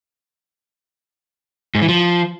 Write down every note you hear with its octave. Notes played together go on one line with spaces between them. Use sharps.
G#2
E3
F3